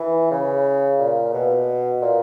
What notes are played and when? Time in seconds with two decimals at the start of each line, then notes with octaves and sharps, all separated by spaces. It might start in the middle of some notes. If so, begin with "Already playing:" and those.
Already playing: E3
0.31 C#3
0.99 A#2
1.33 B2
2.01 A#2